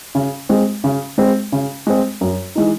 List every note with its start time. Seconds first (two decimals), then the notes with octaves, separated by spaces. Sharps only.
0.15 C#3
0.49 G#3 C4
0.84 C#3
1.18 G#3 C4
1.52 C#3
1.87 G#3 C4
2.21 F#2
2.55 E3 G#3 D#4